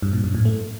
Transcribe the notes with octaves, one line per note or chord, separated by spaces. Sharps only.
G2
A#2
F#2
A2
A3